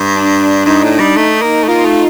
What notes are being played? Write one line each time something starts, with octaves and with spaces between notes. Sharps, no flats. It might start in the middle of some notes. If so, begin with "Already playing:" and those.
Already playing: G2
D4
G2 D#4
A2
G3
A3
A#3
A3
A#3 F4
A3